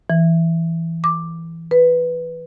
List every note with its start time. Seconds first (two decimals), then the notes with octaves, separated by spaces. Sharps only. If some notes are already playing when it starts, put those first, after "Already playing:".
0.10 E3
1.04 D6
1.71 B4